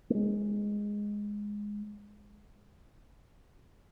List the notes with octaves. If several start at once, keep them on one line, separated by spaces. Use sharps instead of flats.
A3
G#3